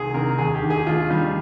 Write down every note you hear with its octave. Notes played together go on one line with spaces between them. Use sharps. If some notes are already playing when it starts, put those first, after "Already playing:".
Already playing: C2 C3 D#3 G#4
C3 D#3 A#4
D#2 G#4
G4
D#3
G#4
D#2 F4
D#3 G3